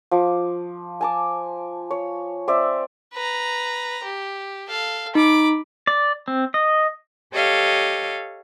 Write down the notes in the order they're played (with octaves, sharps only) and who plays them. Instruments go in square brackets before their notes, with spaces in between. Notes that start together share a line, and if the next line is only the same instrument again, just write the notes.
[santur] F3 D6
G#5 A5 D6
C#5
C4 D5 E5
[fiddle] B4 A#5
G4
A4 F5
[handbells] D#4 [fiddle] B5 D6
[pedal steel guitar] D5
C4
D#5
[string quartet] G4 A4 C#5 D#5 F5